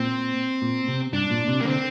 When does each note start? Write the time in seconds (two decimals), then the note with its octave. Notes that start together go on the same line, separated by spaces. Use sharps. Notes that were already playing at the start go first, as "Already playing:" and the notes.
Already playing: A#2 C4
0.62 A#2
0.88 C3
1.13 G2 D4
1.31 A#2
1.48 C3
1.61 A#3
1.65 D3 C4